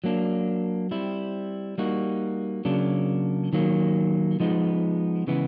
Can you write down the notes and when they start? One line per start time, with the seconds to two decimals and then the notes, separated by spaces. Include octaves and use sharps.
0.04 F#3 A#3 D4
0.91 G3 C4 E4
1.78 G3 A#3 D#4 F#4
2.65 C#3 F#3 A#3 D4
3.53 D#3 F#3 A#3
4.40 F3 G#3 B3 D#4
5.27 C#3 E3 G#3 B3